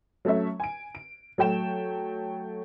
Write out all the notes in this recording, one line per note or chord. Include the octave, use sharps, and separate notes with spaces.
F#3 A3 C#4 E5
G#5 D7
D7
F#3 A3 G5 E7